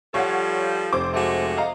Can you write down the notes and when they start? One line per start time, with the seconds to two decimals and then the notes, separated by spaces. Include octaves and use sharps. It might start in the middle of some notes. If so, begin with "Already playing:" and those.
0.14 F3 G3 A4 C#5 F5 F#5
0.93 F1 C5 D6
1.14 G#3 A3 F#4
1.57 D#5 F5 A#5